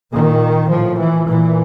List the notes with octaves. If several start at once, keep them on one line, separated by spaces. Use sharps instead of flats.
A#2 D#3
A2 F3
E3
A#2 E3